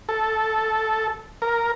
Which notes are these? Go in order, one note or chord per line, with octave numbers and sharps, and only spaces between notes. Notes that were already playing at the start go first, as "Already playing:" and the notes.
A4
A#4